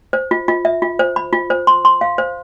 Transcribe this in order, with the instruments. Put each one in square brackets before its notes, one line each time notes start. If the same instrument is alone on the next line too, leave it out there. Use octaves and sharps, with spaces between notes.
[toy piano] C5
F4
F4
E5
F4
C5
B5
F4
C5
C6
C6
F5
C5